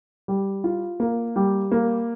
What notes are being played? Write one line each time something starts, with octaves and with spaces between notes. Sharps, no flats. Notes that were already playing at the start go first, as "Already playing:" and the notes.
G3
F4
A#3
G3
A#3